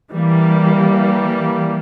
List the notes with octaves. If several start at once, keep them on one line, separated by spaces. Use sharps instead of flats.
E3 G3 A#3